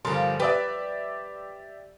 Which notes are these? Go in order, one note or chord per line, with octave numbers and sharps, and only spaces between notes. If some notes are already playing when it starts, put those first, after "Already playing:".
G1 F3 G3 A#4 C6
G4 B4 D5 E5